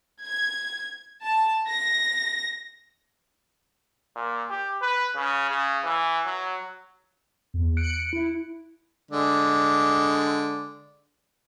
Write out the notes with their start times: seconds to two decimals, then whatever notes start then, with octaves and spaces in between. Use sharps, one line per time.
0.23 G#6
1.22 A5
1.69 A#6
4.16 A#2
4.51 G4
4.82 B4
5.16 C#3
5.51 C#3
5.84 E3
6.26 F#3
7.54 E2
7.77 F#6 C#7 D7
8.13 E4
9.11 D3 G#3 D5